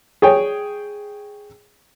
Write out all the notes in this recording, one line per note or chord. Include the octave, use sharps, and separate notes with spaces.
G#4 C#5 G5